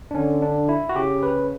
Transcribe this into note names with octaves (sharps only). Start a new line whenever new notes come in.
D4
D3 C#4
D4
E4
F#4
C#3 G4
B4